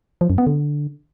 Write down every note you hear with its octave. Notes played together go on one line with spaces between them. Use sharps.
F3
F#2
B3
D3